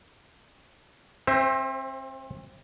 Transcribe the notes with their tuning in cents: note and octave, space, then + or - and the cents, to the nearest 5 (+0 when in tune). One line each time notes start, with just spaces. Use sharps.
C4 +35 C5 +0 E5 +0